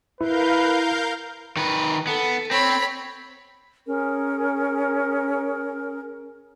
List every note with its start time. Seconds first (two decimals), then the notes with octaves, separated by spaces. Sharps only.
0.21 E4 A#4 B4 F5 G6
1.57 D#3 B4
2.07 B3 A4
2.51 C4 C#5 B5
3.87 C#4 G#4 A#4